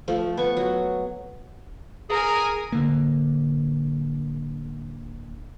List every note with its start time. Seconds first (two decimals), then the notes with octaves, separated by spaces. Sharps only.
0.08 F3 A3
0.37 B3 C#6
0.57 F#3
2.10 G#4 A#4 G#5
2.72 D1 D3 A#3